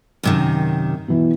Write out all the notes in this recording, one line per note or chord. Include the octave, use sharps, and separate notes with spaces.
F#2 C3 D#3
B2 E3 E4